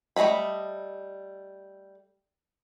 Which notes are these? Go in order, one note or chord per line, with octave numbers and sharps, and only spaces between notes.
G3 A3 G#4 D#5 B5